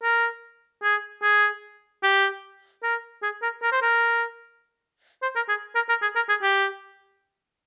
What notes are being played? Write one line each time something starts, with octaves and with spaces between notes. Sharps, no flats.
A#4
G#4
G#4
G4
A#4
G#4
A#4
A#4
C5
A#4
C5
A#4
G#4
A#4
A#4
G#4
A#4
G#4
G4